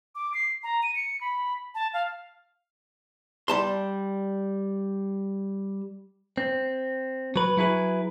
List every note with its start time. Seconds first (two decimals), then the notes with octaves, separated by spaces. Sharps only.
0.15 D6
0.34 C7
0.64 A#5
0.83 D#7
0.96 C#7
1.21 B5
1.75 A5
1.94 F5
3.48 G3 A5 C6
6.38 C4
7.36 F#3 B4
7.57 F#3 E4 G#4 B4